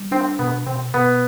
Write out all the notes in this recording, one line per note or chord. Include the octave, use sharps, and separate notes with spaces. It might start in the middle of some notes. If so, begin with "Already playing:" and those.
Already playing: G3
C4 D4
B2 B3
B2 C4
B2 B3